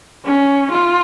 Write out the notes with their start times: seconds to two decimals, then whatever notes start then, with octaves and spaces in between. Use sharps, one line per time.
0.24 C#4
0.71 F4